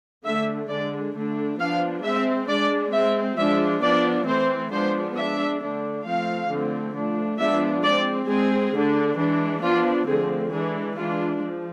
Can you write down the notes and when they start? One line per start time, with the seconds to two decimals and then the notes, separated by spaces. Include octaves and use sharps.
0.25 D3 A3 D4 E5
0.69 D3 G#3 D4 D5
1.15 D3 A3 D4
1.58 F3 B3 D4 F5
2.03 G#3 C4 E5
2.48 G#3 D4 D5
2.92 G#3 C4 E5
3.37 F3 G#3 D4 E5
3.82 F3 B3 D4 D5
4.27 E3 A3 C4 C5
4.72 F3 G#3 B3 D4 C5
5.16 G#3 D4 E5
5.61 D3 A3 D4
6.06 F3 A3 C4 F5
6.50 D3 F3 A3 C4
6.94 F3 A3 D4
7.39 F3 G#3 B3 D4 E5
7.84 G#3 C4 D5
8.28 G#3 C4 G#4
8.73 D3 A3 D4
9.18 E3 G#3 D4
9.62 F3 B3 D4 F4
10.08 D3 F3 A3 C4 G#4
10.52 E3 G#3 D4 G#4
10.96 E3 G#3 D4 F4
11.42 F3